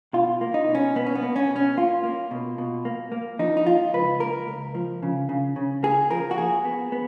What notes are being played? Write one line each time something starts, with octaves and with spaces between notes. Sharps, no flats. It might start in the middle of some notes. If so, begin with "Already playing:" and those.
B2 F4
A#3
D#4
B2
C#4
B2 B3
C#4
B3
A#3
C#4
B2
C#4
A#3 F4
A#3
B2
B2
A#3
A#3
F3 D#4
D#4
F3 F4
C#2 B4
A#3 A#4
C#2
F3
C#3
C#3
C#3
A#3 G#4
F3 A#4
F#4
A#3 G#4
B3
B3